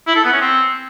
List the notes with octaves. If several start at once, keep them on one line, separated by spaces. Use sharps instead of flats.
E4
A4
B3
C#4
C4